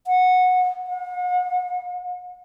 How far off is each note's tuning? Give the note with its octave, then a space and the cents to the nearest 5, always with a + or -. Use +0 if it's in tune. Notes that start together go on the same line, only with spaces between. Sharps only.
F#5 -15
F#5 -45